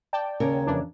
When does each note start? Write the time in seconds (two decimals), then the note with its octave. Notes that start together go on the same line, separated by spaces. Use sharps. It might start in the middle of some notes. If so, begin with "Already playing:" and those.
0.13 D5 G5 A5
0.40 D#2 C#3 A#4
0.67 F2 E3 D4